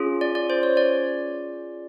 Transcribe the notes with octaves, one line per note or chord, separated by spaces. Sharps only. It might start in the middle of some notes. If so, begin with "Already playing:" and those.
Already playing: C#4 F4 G#4
D5
D5
C5
C#5
D5